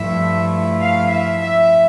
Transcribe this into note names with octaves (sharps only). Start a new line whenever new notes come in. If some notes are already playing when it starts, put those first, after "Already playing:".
Already playing: G2 F3 A3 E4 E5
F5
E5
E5